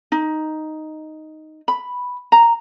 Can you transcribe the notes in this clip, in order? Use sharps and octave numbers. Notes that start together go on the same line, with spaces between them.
D#4
B5
A#5